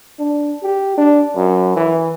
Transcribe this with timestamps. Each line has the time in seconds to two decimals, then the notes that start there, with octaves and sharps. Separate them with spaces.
0.19 D4
0.63 G4
0.98 D4
1.36 F#2
1.76 E3